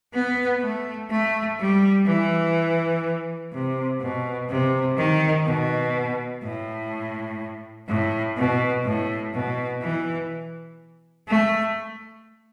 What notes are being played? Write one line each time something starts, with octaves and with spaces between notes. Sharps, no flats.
B3
A3
A3
G3
E3
C3
B2
C3
D#3
B2
A2
A2
B2
A2
B2
E3
A3